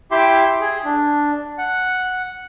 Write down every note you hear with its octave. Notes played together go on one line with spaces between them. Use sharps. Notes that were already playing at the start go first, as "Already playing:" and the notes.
E4 G4 E5 G5 C6 D6
G#4
D4
F#5